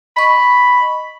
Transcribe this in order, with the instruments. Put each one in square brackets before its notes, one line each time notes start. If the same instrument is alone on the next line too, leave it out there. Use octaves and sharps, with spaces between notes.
[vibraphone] D#5 C#6 [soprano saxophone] B5